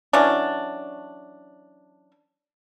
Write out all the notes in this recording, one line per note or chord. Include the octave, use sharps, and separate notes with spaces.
E3 F#3 C#4 D4